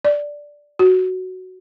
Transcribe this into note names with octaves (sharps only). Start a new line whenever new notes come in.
D5
F#4